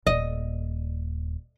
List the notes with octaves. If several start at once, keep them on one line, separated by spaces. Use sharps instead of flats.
D#1 D#5